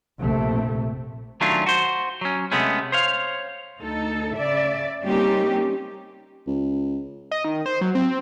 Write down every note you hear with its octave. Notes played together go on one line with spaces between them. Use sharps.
A#1 F2 C3 A3
D#3 F#3 A3 C#4 D4 F4
F#4 C5
F#3 C#4
C3 G#3 A3 B3 C#4
C5 C#5 F5
D2 D#4 A4
C#3 D5 E5
G3 A#3 C4 C#4 D#4 G4
C#2
D#5
D#3
C5
F#3
C4